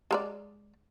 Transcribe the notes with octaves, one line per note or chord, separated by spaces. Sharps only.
G#3 A#4 D5